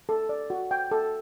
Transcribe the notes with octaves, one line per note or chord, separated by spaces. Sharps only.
A4
D5
F#4
G5
A4